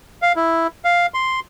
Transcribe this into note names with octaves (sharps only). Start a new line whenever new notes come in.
F5
E4
F5
C6